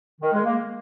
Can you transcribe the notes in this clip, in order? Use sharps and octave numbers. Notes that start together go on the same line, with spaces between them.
D#3
G#3
A#3